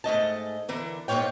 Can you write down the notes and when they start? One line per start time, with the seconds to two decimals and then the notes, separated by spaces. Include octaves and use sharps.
0.04 G#2 A3 D#5 A5
0.69 D3 E3 A#4
1.08 G#2 A#3 E4 F4 C#5 G5